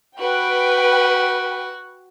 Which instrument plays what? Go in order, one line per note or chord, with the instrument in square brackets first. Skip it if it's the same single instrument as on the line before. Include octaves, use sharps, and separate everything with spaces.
[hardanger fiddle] F#4 [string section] B4 G5